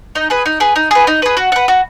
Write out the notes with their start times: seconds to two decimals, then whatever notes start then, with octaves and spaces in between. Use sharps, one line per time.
0.15 D#4
0.30 G#4 B4
0.46 D#4
0.60 G#4 B4
0.76 D#4
0.91 G#4 B4
1.07 D#4
1.22 G#4 B4
1.37 F#4
1.52 B4 F#5
1.68 F#4